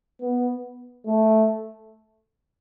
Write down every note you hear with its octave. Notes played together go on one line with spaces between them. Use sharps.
B3
A3